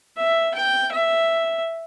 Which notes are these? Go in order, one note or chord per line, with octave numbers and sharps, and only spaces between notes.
E5
G5
E5